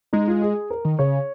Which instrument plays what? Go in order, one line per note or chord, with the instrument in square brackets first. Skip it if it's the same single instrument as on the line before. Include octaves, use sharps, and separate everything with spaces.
[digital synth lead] G#3 [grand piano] D#4
[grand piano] F4
G#4
A#4
[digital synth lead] D#3
[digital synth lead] C#3 [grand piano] C#5